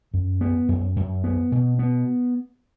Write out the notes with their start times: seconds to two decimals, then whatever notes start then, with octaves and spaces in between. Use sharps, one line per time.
0.14 F#2
0.41 B3
0.69 F#2
0.96 F#2
1.24 B3
1.52 B2
1.79 B3